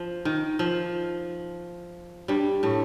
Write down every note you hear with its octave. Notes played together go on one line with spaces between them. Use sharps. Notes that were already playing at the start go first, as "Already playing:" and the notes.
Already playing: F3
D#3
F3
G2 G3
A2 A3